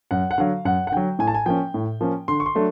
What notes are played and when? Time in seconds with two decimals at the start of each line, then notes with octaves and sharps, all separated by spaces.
0.11 F#2 F#5
0.31 F#5
0.38 D3 F#3 F5
0.65 F#2 F#5
0.87 F#5
0.92 D3 F#3 G5
1.19 A2 G#5
1.27 A5
1.35 G#5
1.46 F3 A#3 C#4 G5
1.74 A2
2.01 F3 A#3 C#4
2.28 D3 C6
2.40 C#6
2.46 C6
2.55 F#3 A3 D4